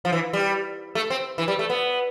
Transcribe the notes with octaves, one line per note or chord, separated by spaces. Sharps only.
F3
E3
G3
A3
C4
E3
G3
A3
B3